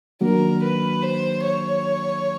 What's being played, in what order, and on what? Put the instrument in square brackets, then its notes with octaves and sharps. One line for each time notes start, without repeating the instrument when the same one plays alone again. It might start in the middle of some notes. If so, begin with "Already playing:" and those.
[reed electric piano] D#3 F#3 A#3 D4 F#4 [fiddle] A#4
[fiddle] B4
C5
C#5